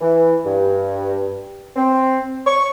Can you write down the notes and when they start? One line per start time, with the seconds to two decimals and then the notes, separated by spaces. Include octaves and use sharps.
0.01 E3
0.45 G2
1.76 C4
2.46 C#6